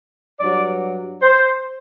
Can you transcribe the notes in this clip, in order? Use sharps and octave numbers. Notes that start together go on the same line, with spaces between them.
G2 F#3 D5
C5